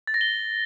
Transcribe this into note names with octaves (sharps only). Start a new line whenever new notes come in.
A6
A#6
G7